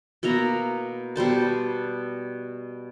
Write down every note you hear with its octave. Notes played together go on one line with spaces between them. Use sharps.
B2 A#3 E4 A#5
B2 G3 C5 A5